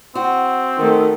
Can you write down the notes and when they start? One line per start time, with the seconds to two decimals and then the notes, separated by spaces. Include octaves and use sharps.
0.15 C4 F#4
0.78 D#3 A3